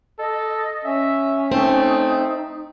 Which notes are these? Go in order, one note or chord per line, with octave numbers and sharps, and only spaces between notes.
A4 D#5
C#4 E5
A3 C4 D#4